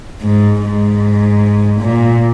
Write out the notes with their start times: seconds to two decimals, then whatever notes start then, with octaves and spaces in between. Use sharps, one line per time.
0.23 G#2
0.63 G#2
1.82 A#2